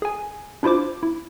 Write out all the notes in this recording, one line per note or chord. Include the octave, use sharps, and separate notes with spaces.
G#4 G#5
D4 E4 F4 C5 D6
E4